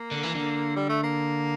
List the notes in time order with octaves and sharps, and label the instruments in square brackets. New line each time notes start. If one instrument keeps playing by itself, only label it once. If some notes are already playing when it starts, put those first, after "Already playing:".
Already playing: [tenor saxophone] A#3
[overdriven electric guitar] D3
E3
D3
[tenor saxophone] G3
A3
A#3